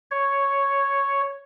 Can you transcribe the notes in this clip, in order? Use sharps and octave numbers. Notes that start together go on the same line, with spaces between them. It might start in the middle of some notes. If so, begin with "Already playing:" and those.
C#5